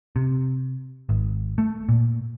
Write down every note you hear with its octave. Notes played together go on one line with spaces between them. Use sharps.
C3
G#1
A3
A#2